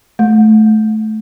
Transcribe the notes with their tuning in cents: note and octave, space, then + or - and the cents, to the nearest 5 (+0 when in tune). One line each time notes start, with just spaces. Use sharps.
A3 -20